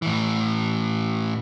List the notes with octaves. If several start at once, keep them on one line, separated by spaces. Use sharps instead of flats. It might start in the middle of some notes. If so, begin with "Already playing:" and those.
A2 E3